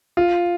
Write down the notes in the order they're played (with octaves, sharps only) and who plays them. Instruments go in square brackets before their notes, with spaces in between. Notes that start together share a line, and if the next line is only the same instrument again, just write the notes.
[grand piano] F4